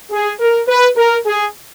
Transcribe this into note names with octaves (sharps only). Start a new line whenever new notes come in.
G#4
A#4
B4
A#4
G#4